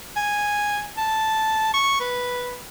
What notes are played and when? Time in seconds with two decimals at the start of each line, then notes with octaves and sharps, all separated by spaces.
0.16 G#5
0.97 A5
1.73 C#6
2.00 B4